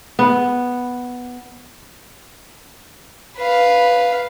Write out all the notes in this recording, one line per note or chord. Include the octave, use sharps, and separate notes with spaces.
B3
B4 F5